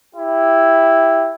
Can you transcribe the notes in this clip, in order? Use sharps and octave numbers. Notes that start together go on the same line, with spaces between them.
E4 G4